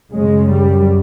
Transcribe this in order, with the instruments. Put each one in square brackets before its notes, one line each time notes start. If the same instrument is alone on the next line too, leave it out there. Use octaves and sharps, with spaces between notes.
[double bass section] F#2 C#3 G#3
G3